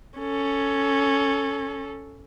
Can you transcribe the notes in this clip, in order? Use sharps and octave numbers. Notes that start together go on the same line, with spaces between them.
C#4 A4